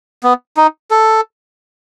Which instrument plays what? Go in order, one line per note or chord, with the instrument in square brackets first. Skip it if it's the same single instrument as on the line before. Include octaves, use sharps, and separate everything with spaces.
[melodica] B3
D#4
A4